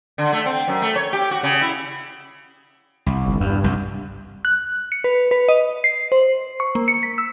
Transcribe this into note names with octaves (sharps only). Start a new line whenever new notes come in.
D3
A3
C4
F#2
A3
C#5
G4
F#4
C#3
E4
C2
G1
E2 G2
C2 F#2
F#6
C#7
B4
B4
D#5
C7
C5
C#6
A#3
C#7
B6
E6